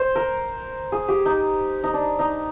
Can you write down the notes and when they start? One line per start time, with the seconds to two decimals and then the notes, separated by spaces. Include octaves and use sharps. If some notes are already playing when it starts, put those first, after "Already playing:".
Already playing: C5
0.15 A#4
0.92 G#4
1.08 G4
1.25 D#4
1.84 D#4
1.94 D4
2.19 D#4